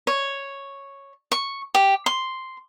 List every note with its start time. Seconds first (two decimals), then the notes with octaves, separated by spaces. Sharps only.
0.07 C#5
1.32 C#6
1.75 G4
2.06 C6